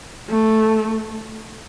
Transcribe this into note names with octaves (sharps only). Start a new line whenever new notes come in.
A3